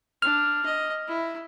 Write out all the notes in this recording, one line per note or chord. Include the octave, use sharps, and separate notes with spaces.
D4 F6
D#5
E4